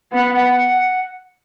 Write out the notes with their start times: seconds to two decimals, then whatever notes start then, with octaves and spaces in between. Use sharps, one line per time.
0.12 B3 F#5
0.33 F#5